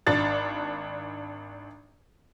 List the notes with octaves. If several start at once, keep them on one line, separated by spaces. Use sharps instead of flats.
G#1 D4 A6